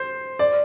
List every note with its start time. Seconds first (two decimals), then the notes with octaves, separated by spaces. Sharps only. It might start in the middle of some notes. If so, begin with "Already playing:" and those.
Already playing: C5
0.39 D5